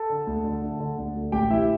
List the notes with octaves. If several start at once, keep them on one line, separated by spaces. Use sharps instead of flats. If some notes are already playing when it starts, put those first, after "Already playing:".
Already playing: A4 A5
D3
D2
D3
D3
D3
D2
D2
A1 G4 G5
E3 E4 E5